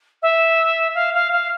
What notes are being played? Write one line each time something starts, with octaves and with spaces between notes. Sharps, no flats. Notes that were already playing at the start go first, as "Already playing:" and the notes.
E5
F5
F5
F5